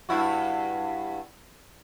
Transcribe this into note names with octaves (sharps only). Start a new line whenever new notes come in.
G2 E4 F#4